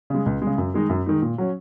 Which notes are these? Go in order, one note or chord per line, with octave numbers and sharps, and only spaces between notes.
C#3 G#3
C#2
C#3 G#3
F#2
D#3 G#3 D#4
F#2
D#3 G#3 D#4
A#2
F#3 C#4